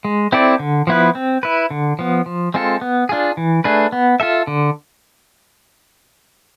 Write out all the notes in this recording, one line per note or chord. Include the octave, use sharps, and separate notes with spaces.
G#3
C4 E4 A4 D5
D3
F3 B3 E4 B4
C4
E4 B4
D3
F3 B3
F3
G#3 C4 F4 A4
B3
D4 F4 G#4
E3
A3 D4 G#4 B4
B3
F4 A4 E5
D3